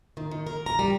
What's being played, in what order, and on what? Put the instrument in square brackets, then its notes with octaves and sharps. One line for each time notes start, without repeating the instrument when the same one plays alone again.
[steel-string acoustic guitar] D#3
D#3
A#4
A#5
G3